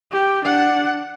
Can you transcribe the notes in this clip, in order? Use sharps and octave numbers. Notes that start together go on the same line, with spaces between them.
G4
D4 F#5